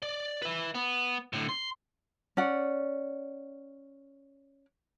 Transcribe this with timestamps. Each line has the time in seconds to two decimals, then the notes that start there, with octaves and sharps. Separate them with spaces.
0.02 D5
0.42 B4 E5
0.75 B3
1.33 A2 D3
1.49 C6
2.37 C#4 D5 F#5